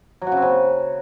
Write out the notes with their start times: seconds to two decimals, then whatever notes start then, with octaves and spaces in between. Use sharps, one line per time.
0.22 F#3
0.27 F#4
0.32 C#3
0.37 C4
0.42 C#3